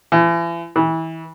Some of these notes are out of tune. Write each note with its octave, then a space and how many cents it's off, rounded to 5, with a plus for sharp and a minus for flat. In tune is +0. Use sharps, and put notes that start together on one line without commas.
E3 +40
E3 -25